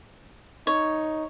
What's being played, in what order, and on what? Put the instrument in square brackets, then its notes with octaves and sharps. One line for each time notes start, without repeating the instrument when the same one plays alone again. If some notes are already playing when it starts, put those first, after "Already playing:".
[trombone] D#4 [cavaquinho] C#5